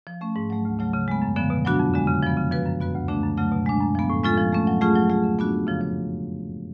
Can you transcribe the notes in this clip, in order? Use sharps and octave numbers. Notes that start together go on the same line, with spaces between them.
F3
A3 C#4
G#2
F#3 A3
D2
C#3 F#3 A3
C#3
G#3 B3
F#2
D3 F3 B3
B2
F#3 B3 D4 F#4
F2
D3 G#3
C#3
F3 B3
C#3
F3 B3 F#4 B4
F#2
F3 B3 F#4 B4
D2
D3 F3 A3 D4
F#2
C#3 F#3 A3
B2
G#3 D4
F#2
F3 B3
A2
G#3 C#4 F4 A4
F3
A3 C#4
F#3
A3 C#4 F4 G#4
F#3
A3 F4 G#4
D3
F#3 B3 D4 F#4
F2
C#3 F3
F3